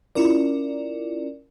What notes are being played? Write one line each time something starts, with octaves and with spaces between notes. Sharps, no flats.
C#4 E4 F4 A#4 D5